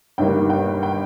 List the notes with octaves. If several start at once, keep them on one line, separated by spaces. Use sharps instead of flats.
G1 G2 D#3 G3 A#3 G5
G5
G5